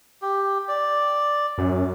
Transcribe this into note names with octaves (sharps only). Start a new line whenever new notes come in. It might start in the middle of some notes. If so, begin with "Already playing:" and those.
G4
D5
F#2